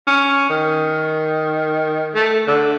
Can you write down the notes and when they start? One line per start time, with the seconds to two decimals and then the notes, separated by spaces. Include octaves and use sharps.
0.07 C#4
0.50 D#3
2.14 A3
2.47 D3